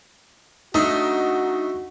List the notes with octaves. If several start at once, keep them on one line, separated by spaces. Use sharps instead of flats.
A3 D4 D#4 F#4